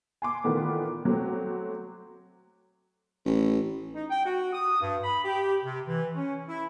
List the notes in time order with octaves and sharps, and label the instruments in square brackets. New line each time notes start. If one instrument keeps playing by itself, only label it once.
[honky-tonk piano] G#5 C6 D6
A#2 D#3 E3 A3 B3
F#3 A3 C4
[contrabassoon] A1
[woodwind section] D#4
G5
F#4
D#6
G2
B5
G4
C3
E3
C#4
E4